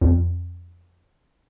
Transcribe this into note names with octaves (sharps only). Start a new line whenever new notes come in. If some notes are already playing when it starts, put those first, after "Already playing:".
F2